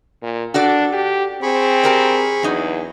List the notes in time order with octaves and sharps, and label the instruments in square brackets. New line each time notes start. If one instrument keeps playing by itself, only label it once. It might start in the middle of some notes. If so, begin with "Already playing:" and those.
[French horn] A#2
[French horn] D4 [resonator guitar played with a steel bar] F#4 A4 D5
[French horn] G4
[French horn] C4 [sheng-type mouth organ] G#4 B5 C#6
[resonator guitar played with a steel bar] G4 A#4 D5
[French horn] E2 [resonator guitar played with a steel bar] F#3 D#4